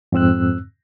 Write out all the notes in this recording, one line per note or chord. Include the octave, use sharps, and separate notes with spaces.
F2 G#2 C4 E6 F#6